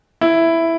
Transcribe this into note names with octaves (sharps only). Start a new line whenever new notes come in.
E4